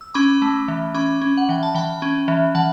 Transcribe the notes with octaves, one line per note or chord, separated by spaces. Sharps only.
E6
C#4 B5 D6
A3
E3
C#4 B5 D6
C#4
F#5
E3 G5
A5
E3 G5 B5
C#4
E3
E3 F#5 A5